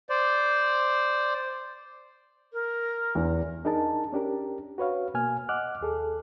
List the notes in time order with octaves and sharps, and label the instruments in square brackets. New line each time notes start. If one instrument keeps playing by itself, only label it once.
[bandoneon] C5 D5
[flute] A#4
[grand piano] E2
[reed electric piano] D4 D#4 G#4 A#4 D#5 A5
C#4 D4 G4 A#4
F#4 B4 C#5 F5
B2 A#3 G#5 F6
D#5 F#5 D6 F6 F#6
D#2 G#4 A4